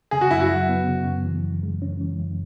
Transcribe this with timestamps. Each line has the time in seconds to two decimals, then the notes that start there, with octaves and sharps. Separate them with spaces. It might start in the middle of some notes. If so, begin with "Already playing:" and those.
0.11 C#3 G#4
0.21 F#4
0.31 F#2 E4
0.40 F#4
0.49 F#3
0.69 B3
0.87 C#3
1.06 F#2
1.26 E3
1.44 F#2
1.63 G#3
1.82 C#4
2.01 E3
2.20 F#2